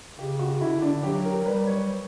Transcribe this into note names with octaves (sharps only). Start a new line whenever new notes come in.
C#3 G4
F#4
D3 E4
D4
F#3 G4
A#4
G3 B4
C#5